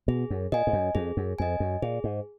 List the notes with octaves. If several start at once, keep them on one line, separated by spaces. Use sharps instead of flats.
B2 G#4
F#2
A#2 D#5 G#5
G#2
F#2
F2 G#4
F#2
F2 D#5 G#5
F#2
A#2 G#4
G#2